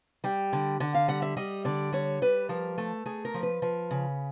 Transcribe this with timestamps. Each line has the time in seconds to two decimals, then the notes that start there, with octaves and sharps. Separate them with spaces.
0.24 G3 G5
0.53 D3
0.80 D3 F#5
0.94 F5
1.08 G3 F#5
1.22 E5
1.37 G3 D#5
1.65 D3 D5
1.93 G3 C#5
2.22 G3 B4
2.49 F3 A#4
2.78 A3 A4
3.06 A3 G#4
3.25 A#4
3.34 F3
3.43 B4
3.62 F3 B4
3.91 C#3